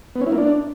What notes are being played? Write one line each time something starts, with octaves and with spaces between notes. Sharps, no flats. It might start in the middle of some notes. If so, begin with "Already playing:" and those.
B3
C#4
E4
A#3
D4